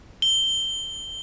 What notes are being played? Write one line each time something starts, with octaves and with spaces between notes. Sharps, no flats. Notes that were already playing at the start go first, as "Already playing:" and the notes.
G7